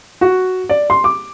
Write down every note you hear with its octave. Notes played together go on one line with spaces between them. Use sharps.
F#4
D5
C6
D6